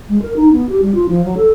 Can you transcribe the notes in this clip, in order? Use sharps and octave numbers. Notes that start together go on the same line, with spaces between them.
G#3
A#4
D#4
B3
G4
G3
F4
F3
F#3
A4